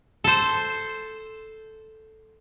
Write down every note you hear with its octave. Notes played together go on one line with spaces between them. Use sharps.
A4 C5